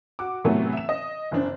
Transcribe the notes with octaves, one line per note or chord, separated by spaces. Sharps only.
F#4 D6
A2 C3 E3 F#3 A3 B3
E5 E7
D#5
F#1 E3 C4 D4